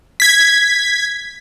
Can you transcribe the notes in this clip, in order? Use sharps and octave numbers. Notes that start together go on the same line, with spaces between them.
G#6 B6